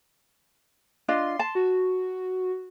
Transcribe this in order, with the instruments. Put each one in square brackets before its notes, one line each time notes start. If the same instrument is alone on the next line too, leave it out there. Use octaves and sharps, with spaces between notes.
[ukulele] D4 F4 D#5 [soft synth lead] C6
[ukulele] A5
[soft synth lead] F#4